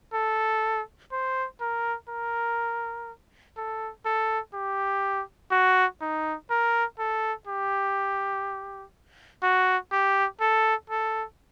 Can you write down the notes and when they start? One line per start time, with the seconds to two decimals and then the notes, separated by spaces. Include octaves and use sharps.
0.13 A4
1.12 C5
1.61 A#4
2.09 A#4
3.57 A4
4.05 A4
4.54 G4
5.51 F#4
6.01 D#4
6.50 A#4
6.99 A4
7.47 G4
9.43 F#4
9.92 G4
10.40 A4
10.90 A4